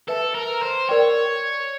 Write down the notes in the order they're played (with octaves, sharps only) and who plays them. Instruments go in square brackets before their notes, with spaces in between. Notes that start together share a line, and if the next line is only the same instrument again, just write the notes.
[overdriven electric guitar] A4 [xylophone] B4 E5 A5
[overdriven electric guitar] A#4
C5
[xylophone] A#4 D5 G5 [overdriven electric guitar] C#5